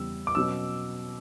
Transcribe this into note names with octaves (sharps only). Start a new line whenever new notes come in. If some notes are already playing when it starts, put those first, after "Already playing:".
Already playing: E2 C#3 G3 B3 E6
D6
B2 F#3 C#4 E6